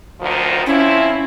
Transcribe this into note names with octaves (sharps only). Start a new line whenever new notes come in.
D2 D#3 F3
F3 C4 C#4 E4